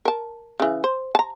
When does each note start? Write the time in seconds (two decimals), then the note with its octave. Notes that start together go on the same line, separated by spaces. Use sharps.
0.05 A#4 A5
0.60 C#3 E3
0.84 C5
1.15 A5 A#5